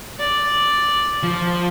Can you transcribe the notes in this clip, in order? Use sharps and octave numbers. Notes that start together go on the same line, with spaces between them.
D5
F3